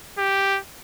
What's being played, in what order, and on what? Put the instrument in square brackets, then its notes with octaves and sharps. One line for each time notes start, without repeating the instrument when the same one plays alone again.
[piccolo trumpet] G4